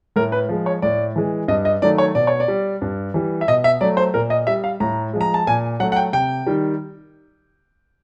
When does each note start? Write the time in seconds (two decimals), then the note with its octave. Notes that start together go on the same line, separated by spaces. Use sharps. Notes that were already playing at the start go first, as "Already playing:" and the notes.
0.16 A2 A#4
0.32 B4
0.49 F3 G#3
0.66 C#5
0.82 A2 D5
1.16 E3 G#3
1.48 G2 D#5
1.65 D#5
1.82 D#3 F#3 A3 D5
1.98 C#5
2.15 B2 D5
2.27 C#5
2.40 D5
2.48 G3
2.82 G2
3.14 E3 G3
3.41 E5
3.48 B2 D#5
3.64 E5
3.81 F#3 D5
3.84 A3
3.97 C5
4.14 A#2 A#4
4.30 D#5
4.47 G3 E5
4.64 F5
4.80 A2 A#5
5.13 F3 G#3
5.21 A#5
5.34 A5
5.47 A#2 G#5
5.80 F#3 F#5
5.83 A3
5.92 F#5
5.96 G5
6.13 C3 G5
6.46 D#3 G3